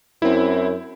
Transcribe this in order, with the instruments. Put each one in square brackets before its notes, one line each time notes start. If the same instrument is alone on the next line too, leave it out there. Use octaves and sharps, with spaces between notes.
[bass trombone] F#2 [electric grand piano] C4 E4